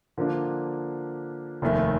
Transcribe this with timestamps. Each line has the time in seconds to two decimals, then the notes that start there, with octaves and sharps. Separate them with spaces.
0.17 D3 F3 A#3 D4
1.62 F1 D#2 D#3 A3